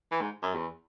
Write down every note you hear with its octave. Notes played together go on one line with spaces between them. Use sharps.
E3
G#2
F#2
E2